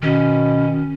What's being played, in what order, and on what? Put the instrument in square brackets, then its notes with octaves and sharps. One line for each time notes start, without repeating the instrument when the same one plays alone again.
[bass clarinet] B2 [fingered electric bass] D#3 [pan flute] C#4